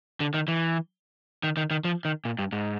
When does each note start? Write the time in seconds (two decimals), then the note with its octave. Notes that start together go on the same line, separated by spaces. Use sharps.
0.20 D3
0.34 D#3
0.48 E3
1.43 D#3
1.57 D#3
1.71 D#3
1.84 F3
2.05 D#3
2.25 A#2
2.39 G2
2.52 G#2